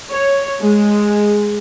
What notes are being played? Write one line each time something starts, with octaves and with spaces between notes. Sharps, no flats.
C#5
G#3